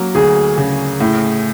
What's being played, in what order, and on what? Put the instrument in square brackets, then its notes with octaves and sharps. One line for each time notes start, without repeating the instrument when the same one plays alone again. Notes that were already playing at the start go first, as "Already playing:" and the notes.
Already playing: [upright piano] F#3 A#3
[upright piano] D2 [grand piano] G#4
[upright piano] C#3
A2